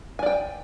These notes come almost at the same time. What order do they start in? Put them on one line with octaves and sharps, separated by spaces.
G#5 D5 G5